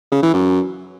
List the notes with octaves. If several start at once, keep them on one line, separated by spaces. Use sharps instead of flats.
C#3
E3
F#2